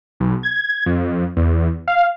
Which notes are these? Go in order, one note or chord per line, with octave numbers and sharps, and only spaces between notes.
B1
G#6
F2
E2
F5